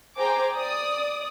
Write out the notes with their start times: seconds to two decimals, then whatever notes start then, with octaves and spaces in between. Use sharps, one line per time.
0.18 G#4 C5 G5 G#5 A#5 D6
0.55 D5 D#6